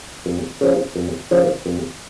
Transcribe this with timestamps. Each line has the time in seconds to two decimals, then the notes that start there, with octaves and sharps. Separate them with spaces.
0.26 F2
0.61 C#3 F3
0.96 F2
1.31 C#3 F3
1.66 F2